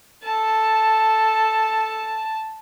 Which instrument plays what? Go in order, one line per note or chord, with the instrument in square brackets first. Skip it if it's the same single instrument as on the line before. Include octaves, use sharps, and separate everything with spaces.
[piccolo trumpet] A4 [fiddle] A5